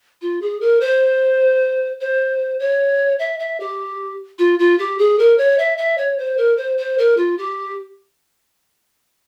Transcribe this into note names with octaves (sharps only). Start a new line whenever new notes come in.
F4
G#4
A#4
C5
C5
C#5
E5
E5
G4
F4
F4
G4
G#4
A#4
C#5
E5
E5
C#5
C5
A#4
C5
C5
A#4
F4
G4